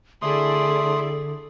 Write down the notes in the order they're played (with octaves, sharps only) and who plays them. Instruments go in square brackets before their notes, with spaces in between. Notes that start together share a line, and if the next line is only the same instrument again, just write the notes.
[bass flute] D3 [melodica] A3 C6 D#6 [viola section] E4 G#4 D5